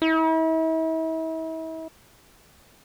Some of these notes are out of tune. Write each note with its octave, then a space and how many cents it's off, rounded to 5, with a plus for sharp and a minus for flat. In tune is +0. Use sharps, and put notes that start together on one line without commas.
E4 -40